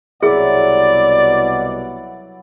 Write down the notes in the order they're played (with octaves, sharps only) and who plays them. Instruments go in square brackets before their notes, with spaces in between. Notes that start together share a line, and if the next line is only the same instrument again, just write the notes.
[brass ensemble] C2 B2 F#5 [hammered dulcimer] F#3 E4 [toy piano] G#4 [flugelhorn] D5